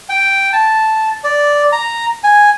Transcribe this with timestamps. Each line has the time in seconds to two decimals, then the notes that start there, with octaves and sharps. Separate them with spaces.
0.09 G5
0.53 A5
1.24 D5
1.72 A#5
2.24 G#5